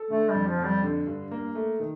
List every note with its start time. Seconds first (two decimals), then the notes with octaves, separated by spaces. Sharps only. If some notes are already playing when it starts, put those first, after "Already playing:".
Already playing: A4
0.10 D3 A3
0.29 G3
0.35 F2
0.47 F3
0.59 F2
0.65 G3
0.83 D3
1.07 G2
1.31 A#3
1.55 A3
1.80 D#3